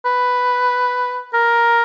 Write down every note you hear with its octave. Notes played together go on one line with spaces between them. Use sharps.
B4
A#4